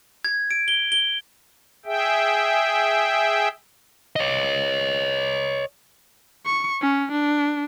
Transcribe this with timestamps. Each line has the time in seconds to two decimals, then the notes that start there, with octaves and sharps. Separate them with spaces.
0.25 G#6
0.51 D7
0.68 G7
0.92 G7
1.85 G#4 E5 G5
4.16 C#5 D#5
6.45 C#6
6.81 C#4
7.12 D4